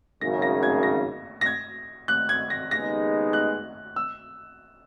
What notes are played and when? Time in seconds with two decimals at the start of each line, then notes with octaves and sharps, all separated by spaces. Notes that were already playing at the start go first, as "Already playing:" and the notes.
0.21 G#1 F#2 C#3 A#6
0.42 A#6
0.63 G#6
0.83 A#6
1.41 A#6
1.46 G#6
2.08 F#6
2.29 G#6
2.50 A#6
2.70 D#2 C#3 G#3 B3 D#4 A#6
3.33 F#6
3.96 E6